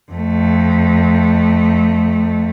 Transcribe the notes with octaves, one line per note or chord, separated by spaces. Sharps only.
F2 A3